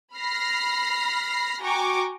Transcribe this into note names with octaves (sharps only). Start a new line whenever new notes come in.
B5 F6 A#6 C7
F#4 G5 G#5 A#5 C#6 D6